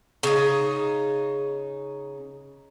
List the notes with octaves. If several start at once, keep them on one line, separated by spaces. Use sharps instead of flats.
C#3 D#4